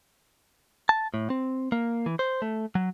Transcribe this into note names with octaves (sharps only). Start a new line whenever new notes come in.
A5
A2
C4
A#3
E3
C5
A3
F#3